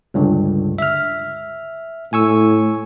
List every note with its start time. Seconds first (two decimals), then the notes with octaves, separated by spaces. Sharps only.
0.14 C#2 G2 D3
0.78 E5 F6
2.13 A2 G#5 C#6 E6